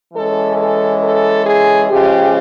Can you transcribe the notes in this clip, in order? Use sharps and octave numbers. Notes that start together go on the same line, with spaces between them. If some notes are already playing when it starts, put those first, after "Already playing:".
E3 G#3 C#4 A4
A4
A4
G#4
C#3 F3 G#3 G4